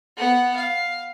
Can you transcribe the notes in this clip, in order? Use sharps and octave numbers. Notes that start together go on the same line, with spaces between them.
B3 F#5
F5